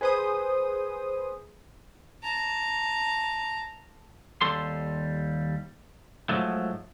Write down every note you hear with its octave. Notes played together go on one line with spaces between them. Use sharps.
G#4 B4 C5 G#5 D#6
A5 A#5
D#2 G3 A4 C6
G#2 F3 F#3 A3